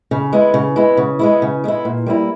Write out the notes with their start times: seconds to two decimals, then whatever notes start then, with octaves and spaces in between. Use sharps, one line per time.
0.11 C#3
0.33 G#3 B3 E4
0.54 C#3
0.76 G#3 B3 E4
0.97 C#3
1.19 G#3 B3 E4
1.42 C#3
1.64 G#3 B3 E4
1.85 A#2
2.06 G3 A#3 E4